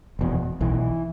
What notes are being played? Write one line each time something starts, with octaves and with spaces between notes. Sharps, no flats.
F1 E2 B2
B1 B2 E3